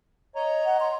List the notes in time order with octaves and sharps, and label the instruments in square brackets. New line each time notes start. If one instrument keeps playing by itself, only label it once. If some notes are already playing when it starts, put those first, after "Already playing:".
[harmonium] C#5 D#5 A#5
[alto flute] F#5
C6